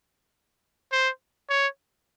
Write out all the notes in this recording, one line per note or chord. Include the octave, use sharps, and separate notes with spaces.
C5
C#5